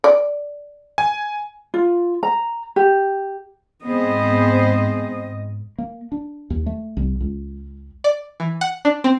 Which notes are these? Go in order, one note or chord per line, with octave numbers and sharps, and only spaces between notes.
D5
G#5
F4
A#5
G4
G#2 B3 C4 G#4 C5 D#5
A#3
D4
D#2
A3
C2
C#2
D5
E3
F#5
D4
C4